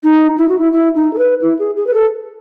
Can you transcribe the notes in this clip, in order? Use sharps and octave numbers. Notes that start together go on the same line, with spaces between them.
D#4
E4
F#4
E4
E4
D#4
A4
B4
E4
G#4
G#4
B4
A4